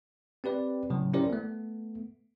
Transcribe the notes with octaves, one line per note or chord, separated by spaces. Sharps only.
C4 G4 B4 D5
A2 C#3 F#3
C#4 E4 G4 A#4 C5 D5
A3 B3